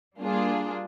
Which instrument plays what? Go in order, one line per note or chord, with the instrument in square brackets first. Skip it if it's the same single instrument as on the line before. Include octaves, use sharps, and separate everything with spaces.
[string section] G3 A#3 D4 F4 G#4